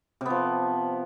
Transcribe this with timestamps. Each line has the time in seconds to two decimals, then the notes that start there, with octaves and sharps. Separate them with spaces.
0.21 C3
0.26 B3
0.30 F3